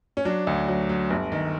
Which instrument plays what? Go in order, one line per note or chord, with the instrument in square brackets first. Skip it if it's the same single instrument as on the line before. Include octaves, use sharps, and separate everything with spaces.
[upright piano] C#4
F#3 D4
D2
F#3
F#3
G1
D#3